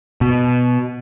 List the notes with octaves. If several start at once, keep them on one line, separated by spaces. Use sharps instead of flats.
B2